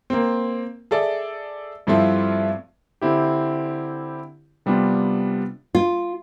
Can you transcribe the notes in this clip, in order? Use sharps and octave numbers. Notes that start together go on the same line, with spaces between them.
A#3 C4
G#4 A4 D5 E5
G2 F3 A3 C4 E4 F4
D3 C4 E4 G4
C3 G3 B3 D4 F4
F4